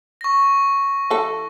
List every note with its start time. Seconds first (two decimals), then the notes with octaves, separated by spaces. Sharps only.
0.21 C#6 A#6
1.10 E3 A4